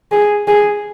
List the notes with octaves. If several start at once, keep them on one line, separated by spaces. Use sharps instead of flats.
G#4
G#4